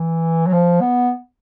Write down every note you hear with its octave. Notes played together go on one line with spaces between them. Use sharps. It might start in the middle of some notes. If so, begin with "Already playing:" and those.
Already playing: E3
F#3
F3
B3